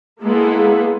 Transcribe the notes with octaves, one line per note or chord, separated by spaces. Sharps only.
G#3 A#3 B3 E4 G#4 A4